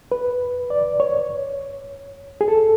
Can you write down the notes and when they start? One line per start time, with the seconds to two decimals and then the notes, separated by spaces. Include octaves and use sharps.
0.12 B4
0.70 D5
1.00 C#5
2.41 G#4
2.48 A4